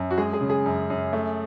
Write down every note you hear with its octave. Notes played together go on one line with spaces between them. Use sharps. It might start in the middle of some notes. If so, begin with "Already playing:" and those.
Already playing: F#2
F#4
G#3 G#4
G#4
C#3
G#4
F#2
F#2
A3